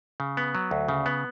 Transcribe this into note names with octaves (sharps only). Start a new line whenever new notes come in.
C#3
B3
F#3
D2
C#3
B3